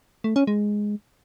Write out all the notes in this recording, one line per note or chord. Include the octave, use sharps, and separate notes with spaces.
A3
C#4
G#3